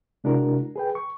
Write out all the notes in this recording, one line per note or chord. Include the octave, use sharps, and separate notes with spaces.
C3 G#3 D4 E4 F#4 A#4
G#4 B4 G5
C#6